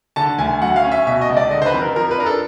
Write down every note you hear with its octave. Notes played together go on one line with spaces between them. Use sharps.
D3 A5
D2 G#5
F#3 F#5
F5
C#4
E5
B2 E5
D#5
C#2
D5
D3 D#5
C5
B4
F2
A#4
F3 A#4
B4
D4 A#4
A4